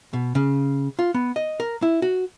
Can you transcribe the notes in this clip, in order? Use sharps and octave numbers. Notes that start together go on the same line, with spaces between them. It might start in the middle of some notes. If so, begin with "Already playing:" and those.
B2
C#3
F4
B3
D#5
A#4
E4
F#4